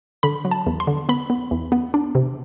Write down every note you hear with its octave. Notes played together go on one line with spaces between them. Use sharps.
D3 B5
F#3
A5
E2
C6
D3
B3 B5
B3
E2
B3
D4
C3